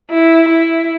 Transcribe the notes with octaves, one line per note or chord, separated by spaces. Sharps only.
E4
E4